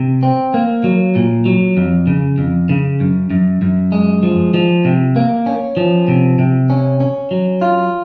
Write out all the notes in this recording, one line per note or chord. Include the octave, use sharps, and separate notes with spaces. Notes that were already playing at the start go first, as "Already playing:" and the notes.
Already playing: C3
C4
A#3
F#3
A#2
F#3
F2
C#3
F2
C#3
F#2
F#2
F#2
G#3
F3
F3
C3
A#3
C#4
F3
C3
C3
C#4
C#4
F#3
F4